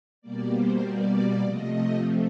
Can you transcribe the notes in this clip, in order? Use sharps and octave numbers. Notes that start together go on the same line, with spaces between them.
B2 G3 A#3 D5
C5
D5
C3 F3 A3 D#5